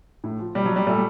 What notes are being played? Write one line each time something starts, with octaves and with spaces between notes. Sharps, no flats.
A2
F3
B2 G3
F#3
G3
A#2 G3 A3